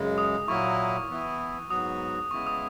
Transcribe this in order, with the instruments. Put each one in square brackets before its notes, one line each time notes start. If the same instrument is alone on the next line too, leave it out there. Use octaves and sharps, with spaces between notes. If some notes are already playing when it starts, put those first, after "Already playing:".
Already playing: [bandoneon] F#2 C#3 G#3
[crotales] D#6
[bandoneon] A#2 F#3 A#3 E4 [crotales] C#6
[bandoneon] E3 B3 E4
[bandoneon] G#2 F#3 B3 F#4 [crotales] D#6
[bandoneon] C#3 G#3 B3 E4 [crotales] C#6
[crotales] D#6